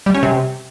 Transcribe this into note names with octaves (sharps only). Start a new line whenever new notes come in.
G3
C#4
C3